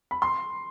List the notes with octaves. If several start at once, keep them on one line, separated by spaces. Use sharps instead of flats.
B5
C6